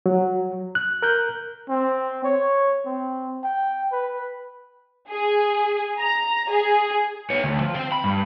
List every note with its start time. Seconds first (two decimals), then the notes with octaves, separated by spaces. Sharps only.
0.06 F#3
0.75 F#6
1.02 A#4 F#6 G6
1.70 C4
2.24 C#5
2.86 C4
3.44 G5
3.92 B4
5.10 G#4
5.99 A#5
6.50 G#4
7.30 B3 C#5
7.44 D2
7.61 F3
7.74 C5 G5
7.92 B5
8.04 G2